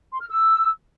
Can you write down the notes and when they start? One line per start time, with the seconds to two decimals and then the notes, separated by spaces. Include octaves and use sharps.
0.12 C6
0.20 F6
0.29 E6